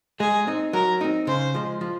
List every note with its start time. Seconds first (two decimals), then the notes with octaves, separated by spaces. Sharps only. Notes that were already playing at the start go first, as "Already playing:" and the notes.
0.20 G#3 G#4
0.47 C4 D#4
0.73 F#3 A#4
1.01 C4 D#4
1.27 C#3 C5
1.54 F3 G#3
1.81 F3